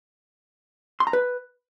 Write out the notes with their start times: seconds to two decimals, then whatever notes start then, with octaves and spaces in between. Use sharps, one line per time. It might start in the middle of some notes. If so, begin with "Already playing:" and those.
1.00 C6
1.07 A#5
1.13 B4